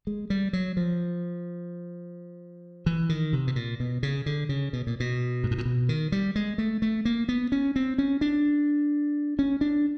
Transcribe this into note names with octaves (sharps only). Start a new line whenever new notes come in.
G#3
G3
F#3
F3
E3
D#3
C3
B2
A#2
B2
C#3
D3
C#3
B2
A#2
B2
G#2
A2
A#2
B2
D#3
G3
G#3
A3
A3
A#3
B3
C#4
C4
C#4
D4
C#4
D4